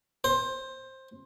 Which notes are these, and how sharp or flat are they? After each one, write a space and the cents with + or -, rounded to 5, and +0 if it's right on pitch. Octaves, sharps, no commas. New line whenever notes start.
C5 +15